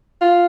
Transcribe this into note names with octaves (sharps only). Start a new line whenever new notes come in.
F4